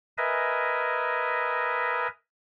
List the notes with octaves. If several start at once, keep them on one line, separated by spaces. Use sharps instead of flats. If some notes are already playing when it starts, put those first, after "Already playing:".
A#4 B4 D#5 E5 G#5